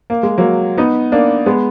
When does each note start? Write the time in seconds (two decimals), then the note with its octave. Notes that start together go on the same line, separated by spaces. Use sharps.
0.10 A#3
0.23 G#3
0.38 F#3 A#3
0.78 B3 D#4
1.12 A#3 D4
1.46 G#3 B3